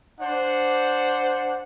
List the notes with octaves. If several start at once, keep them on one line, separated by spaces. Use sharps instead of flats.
D4 C5 F#5